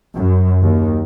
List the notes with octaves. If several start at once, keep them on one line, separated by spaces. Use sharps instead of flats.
F#2
D#2